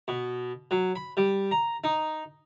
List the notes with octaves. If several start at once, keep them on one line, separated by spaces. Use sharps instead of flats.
B2
F#3
B5
G3
A#5
D#4